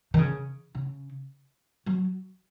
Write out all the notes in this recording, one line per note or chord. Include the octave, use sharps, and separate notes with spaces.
D#3
C#3
C#3
F#3